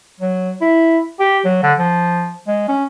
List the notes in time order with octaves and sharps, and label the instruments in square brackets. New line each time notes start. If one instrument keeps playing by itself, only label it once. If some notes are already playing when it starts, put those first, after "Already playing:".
[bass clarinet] F#3
E4
G4
F#3
D3
F3
G#3
C#4